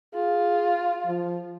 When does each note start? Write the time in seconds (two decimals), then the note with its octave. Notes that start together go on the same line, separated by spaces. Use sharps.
0.14 F4 G#4
1.06 F3